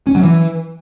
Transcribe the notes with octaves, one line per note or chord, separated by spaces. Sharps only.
C#4
F#3
E3